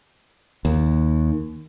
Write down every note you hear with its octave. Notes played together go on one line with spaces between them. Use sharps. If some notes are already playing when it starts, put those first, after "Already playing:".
D#2